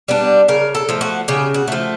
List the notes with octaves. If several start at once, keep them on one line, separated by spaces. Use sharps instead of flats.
G3 B3 D4
C#3 A#4
A4
F3 A3
F#4
C#3 G4
F#4
F3 A3